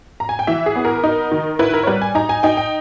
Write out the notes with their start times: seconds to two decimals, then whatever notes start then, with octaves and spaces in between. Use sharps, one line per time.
0.20 A#5
0.29 G#5
0.39 G5
0.47 E3 E5
0.66 G#4
0.76 B3
0.85 A#4
1.04 D#4
1.32 D#3
1.59 E4 B4
1.74 A#4
1.83 C#5
1.87 G3 B4
2.02 G#5
2.15 D#4 A#5
2.29 G#5
2.43 D#4 G5
2.57 G5